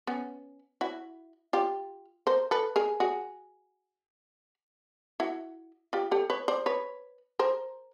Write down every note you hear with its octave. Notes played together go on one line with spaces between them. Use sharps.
B3 C#4
E4 F#4
F4 G4
A#4 C5
A4 B4
G#4 A#4
F#4 G#4
E4 F#4
F4 G4
G4 A4
B4 C#5
C5 D5
B4 C#5
A#4 C5